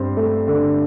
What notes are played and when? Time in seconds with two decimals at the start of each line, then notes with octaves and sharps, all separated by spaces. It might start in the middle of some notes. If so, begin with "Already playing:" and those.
Already playing: G2 C4
0.17 A3
0.48 D3